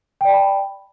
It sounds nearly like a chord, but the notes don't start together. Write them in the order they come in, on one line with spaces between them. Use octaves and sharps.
G5 D5 A5 B5